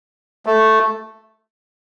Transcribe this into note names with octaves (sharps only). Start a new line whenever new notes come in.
A3